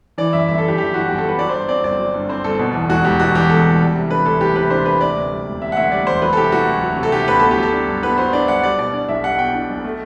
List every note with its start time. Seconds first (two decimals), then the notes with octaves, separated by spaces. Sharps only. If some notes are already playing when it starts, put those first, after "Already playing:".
0.18 E3 D5
0.33 F#2 E5
0.48 G1 E5
0.58 A4
0.63 G1 G4
0.78 E3 G4
0.93 F#2 F#4
1.08 G1 G4
1.18 A4
1.24 G1 B4
1.39 F#3 D5
1.49 C5
1.53 G2 D5
1.69 C4 D5
1.84 G1 D5
1.99 F#3
2.14 G2
2.29 C4 C5
2.44 G1 A4
2.59 B2
2.74 E2
2.89 E1 F#4
3.05 E1 G4
3.20 B2 F#4
3.35 E2 G4
3.50 E1 A4
3.65 E1
3.80 G3
3.95 C3
4.10 D4 B4
4.26 D2 A4
4.41 G3 G4
4.56 C3 B4
4.70 D4 C5
4.86 D2 B4
5.01 C3 D5
5.16 D2
5.31 G3
5.46 E1
5.62 C3 E5
5.72 F#5
5.77 D2 E5
5.92 G3 D5
6.07 E1 C5
6.22 F#3 B4
6.33 A4
6.37 C3 G4
6.52 A3 F#4
6.67 D2
6.83 F#3
6.97 C3
7.03 A4
7.12 A3 G4
7.28 D2 B4
7.40 B3 A4
7.51 G4
7.57 F#3
7.63 A4
7.73 D4
7.88 G2
8.03 B3 B4
8.18 F#3 C5
8.33 D4 D5
8.48 G2 F#5
8.63 G3 D5
8.78 B2 D5
8.94 D4 D5
9.09 B1 E5
9.24 G3 F#5
9.39 B2 G5
9.54 D4
9.70 B1
9.84 A3